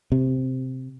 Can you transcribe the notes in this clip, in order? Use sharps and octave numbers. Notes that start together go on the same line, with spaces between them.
C3